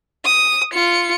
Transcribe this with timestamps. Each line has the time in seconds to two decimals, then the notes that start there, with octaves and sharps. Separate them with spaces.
0.25 D#6
0.74 F4 C#7